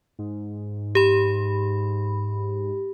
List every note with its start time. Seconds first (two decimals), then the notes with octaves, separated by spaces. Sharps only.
0.19 G#2
0.95 G4 B5